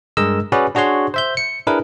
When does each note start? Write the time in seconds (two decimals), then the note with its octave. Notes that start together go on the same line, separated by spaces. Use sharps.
0.17 G2 G#3 A#4 D#5 E6
0.52 C#4 F#4 G#4 B4 D5
0.75 D4 F#4 G#4 C#5 C6
1.14 C5 E5 G6
1.37 C#7
1.67 D4 E4 G#4 A#4 B4